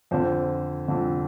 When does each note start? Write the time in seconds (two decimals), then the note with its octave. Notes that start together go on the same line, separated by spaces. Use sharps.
0.11 F2 D3 C5
0.88 F2 D3